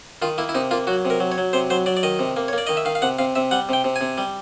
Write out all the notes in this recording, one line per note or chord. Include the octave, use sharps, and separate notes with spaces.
D#3 F4
A#3 E4
E4
C3 D#4
A#3 F4
F#3 F#4
C3
A#4
F#3
C#5
F#3
C3 C5
F#3 C5
F#3 D5
D5
D#3 D#5
C3
A#3
C#5
A#3 D5
D#3 D#5
E5
D#3 F5
F5
C3 F#5
C3 F5
C3 E5
G3 F#5
C3 G5
C3
G#5
C3
G3